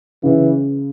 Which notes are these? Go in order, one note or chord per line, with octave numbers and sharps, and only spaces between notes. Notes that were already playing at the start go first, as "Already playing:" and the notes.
C#3 E3